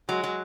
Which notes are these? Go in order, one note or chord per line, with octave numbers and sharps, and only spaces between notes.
F#3 G#3
F#3